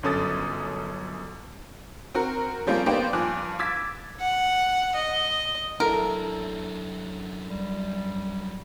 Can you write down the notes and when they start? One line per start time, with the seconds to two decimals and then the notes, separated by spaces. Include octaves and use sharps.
0.03 G1 F#2 C#4 A4 D#6 A6
2.15 C4 F#4 A#4
2.67 F3 G3 G#3 A#3 C4 C#4
2.86 A#3 B3 D#4 G4 C5 D5
3.13 G2 F3 G#5 D6 F#6
3.59 D6 E6 G#6 A6 B6
4.20 F#5
4.95 D#5
5.80 F#2 D4 E4 A4 A#4
7.46 G3